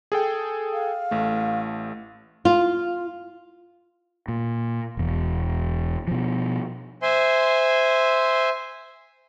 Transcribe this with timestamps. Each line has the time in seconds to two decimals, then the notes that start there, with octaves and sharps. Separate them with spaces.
0.12 G#4 A4 G5
0.73 F5
1.11 A1 A3
2.45 F4
4.28 A#2
4.97 E1 E2
6.07 B2 F3
7.02 C5 E5 G#5 C6